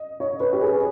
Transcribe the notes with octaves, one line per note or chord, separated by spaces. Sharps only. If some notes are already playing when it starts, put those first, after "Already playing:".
Already playing: D#5
C#5
B4
G4
G#4